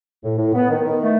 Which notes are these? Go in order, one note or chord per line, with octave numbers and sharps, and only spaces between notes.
A2
A2
B3
D#3
D#3
A3